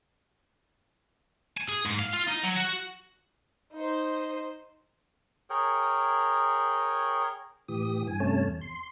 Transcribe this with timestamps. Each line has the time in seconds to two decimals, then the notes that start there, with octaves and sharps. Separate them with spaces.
1.57 G#5
1.69 G#4
1.85 G#2
1.99 F5
2.13 F4
2.28 D#4
2.43 F#3
2.56 F#4
3.73 D#4 C5
5.50 G#4 A#4 C#5 G5
7.68 A2 E3 G4 D#6
8.07 G2 G#5
8.20 G2 C3 A3 C#4 C#5 A5
8.45 E2
8.61 C6